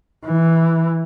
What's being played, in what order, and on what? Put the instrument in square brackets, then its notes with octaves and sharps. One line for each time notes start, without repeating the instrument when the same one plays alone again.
[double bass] E3